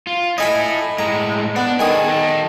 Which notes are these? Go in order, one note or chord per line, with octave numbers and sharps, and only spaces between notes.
F4
E4 A4 D#5 G#5 B5
A2 G#3 A#5
B3 D4
D#3 G#4 A4 G#5 D#6
A4 D#5 A5